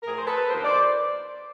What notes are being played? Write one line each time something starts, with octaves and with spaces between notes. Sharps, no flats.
A2 F3 A3 G#4 A#4
C5
A4 B4
D#2 D3 F3 A#3 A#4 C5
C5 D5